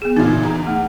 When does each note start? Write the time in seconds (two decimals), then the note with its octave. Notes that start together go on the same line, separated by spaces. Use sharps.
0.02 B3 G#4
0.16 A#2 E3 C4 D#4
0.43 E2 A#5
0.67 A3 F#5